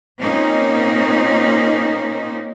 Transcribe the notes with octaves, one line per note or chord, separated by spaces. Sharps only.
A#2 A#3 C4 C#4 D#4